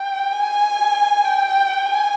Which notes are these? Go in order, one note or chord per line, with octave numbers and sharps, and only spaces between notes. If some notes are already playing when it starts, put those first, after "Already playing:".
Already playing: G5
G#5
G5
G#5